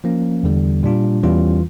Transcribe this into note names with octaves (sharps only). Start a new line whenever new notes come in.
F3 A#3 C#4
E2 D3 G3
A#2 G3 D4 F4
E2 E3 G3 C#4 F4